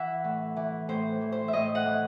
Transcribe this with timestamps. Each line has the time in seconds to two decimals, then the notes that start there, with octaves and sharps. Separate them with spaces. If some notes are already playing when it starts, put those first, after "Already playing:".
Already playing: E3 E5 F#5
0.24 A2
0.56 E3
0.89 A2 C5
1.21 E3
1.32 C5
1.48 E5
1.53 A2 D#5
1.75 F#5
1.86 E3